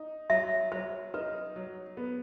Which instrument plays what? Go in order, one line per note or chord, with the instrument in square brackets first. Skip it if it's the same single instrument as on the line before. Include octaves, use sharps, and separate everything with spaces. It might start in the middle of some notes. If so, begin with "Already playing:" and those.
Already playing: [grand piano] D#4
[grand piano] F#3 [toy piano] E5
[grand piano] F#3 [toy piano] C5
[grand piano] D#4 [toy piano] B4
[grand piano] F#3
B3